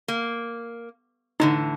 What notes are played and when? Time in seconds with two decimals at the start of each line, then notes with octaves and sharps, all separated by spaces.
0.08 A#3
1.40 A2 D3 E3 D#4